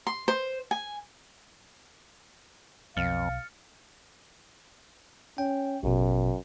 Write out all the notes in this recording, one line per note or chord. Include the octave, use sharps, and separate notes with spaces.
C6
C5
G#5
B1 F2 F5 F6 A6 C#7
C#4 G5
A1 F#2 B2